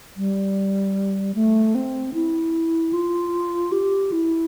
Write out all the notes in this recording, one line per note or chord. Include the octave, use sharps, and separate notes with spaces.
G3
A3
C4
E4
F4
G4
E4